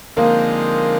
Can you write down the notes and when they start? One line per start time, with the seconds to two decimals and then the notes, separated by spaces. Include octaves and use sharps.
0.16 D3 F3 G#3 A#3 C4 D#4